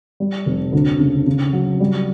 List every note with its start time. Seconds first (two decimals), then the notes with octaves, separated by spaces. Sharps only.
0.20 G3
0.46 F1
0.72 D2
1.00 C#3
1.26 C#3
1.53 F#3
1.80 G3